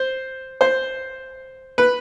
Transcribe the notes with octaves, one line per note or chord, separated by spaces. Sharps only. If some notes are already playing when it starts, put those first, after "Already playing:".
Already playing: C5
C5
B4